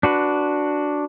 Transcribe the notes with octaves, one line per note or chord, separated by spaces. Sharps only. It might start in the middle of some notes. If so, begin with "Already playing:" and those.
D4 F#4 B4